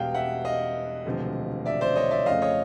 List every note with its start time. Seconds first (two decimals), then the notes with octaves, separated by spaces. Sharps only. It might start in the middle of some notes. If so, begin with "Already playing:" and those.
Already playing: E1 E2 B2 G3 F5 G5
0.15 E5 F#5
0.45 D#5 F5
1.06 E1 D2 C3 F3
1.66 D5 E5
1.81 C5 D5
1.96 C#5 D#5
2.11 D5 E5
2.26 F2 C#3 F3 A3 D#5 F5
2.42 C#5 D#5